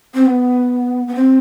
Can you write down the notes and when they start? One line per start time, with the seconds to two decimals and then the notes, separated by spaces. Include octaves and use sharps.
0.14 C4
0.26 B3
1.07 B3
1.15 C4